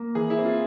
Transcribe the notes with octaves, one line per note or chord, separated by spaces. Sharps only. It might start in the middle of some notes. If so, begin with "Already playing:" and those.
Already playing: A#3
E3 G#4
E4
C4
F4